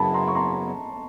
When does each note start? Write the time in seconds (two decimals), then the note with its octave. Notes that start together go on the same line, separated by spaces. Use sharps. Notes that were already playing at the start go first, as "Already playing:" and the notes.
Already playing: F#2 C#3 F#3 B3 E4 A5 B5
0.14 A#5 C6
0.28 C#6
0.35 A#5 C6